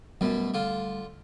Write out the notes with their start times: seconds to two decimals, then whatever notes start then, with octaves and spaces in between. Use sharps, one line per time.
0.21 F#2 B2 G3 A3
0.54 D3 F4